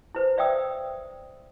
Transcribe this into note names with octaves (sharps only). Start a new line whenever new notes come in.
E4 B4 C5
D5 E5 F5 G5 D#6 E6